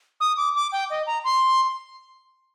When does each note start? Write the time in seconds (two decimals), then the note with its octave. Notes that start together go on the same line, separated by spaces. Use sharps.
0.20 D#6
0.37 D6
0.55 D6
0.72 G5
0.90 D#5
1.07 A#5
1.24 C6